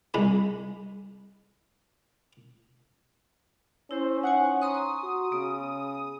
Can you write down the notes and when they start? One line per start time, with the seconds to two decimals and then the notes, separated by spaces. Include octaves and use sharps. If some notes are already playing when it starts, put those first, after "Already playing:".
0.14 C2 G#3 D#4 B5
3.91 C#4 E4 C5
4.24 D#4 C5 F#5 G#5
4.62 A#5 C6 C#6 D#6
5.03 F#4
5.32 C#3 B3